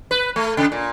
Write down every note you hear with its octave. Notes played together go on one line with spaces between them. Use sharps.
B4
A3
C#3
A#2